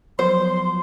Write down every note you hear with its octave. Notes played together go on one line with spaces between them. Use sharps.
F3 F#3 B3 C5 C6